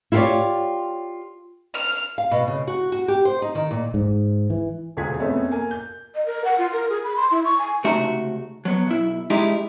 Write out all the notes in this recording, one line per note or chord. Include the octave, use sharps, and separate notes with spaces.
E4 F4 G4 A4 C#5 D5
F6
F5
B2
C#3
F#4
F#4
G4
C5
D#4
D#3
A#2
G#2
E3
E1 D2 F4 G#4 G#6 B6
F2 A3 B3 C#4
A#3 G#5
G6
D#5
A#4
F#5
F4
A#4
G#4
B5
C6
E4
C#6
G#5
C#2 C3 A3 D#4 F#4 E5
F#3 B3
B1 E4
G#3 D#4 E4 G4